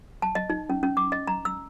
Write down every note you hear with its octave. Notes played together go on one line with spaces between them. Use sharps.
A5
D#5
D#4
C#4
C#4
D6
D#5
A#5
E6